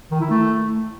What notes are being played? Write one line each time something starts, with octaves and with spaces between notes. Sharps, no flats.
D#3
E4
A3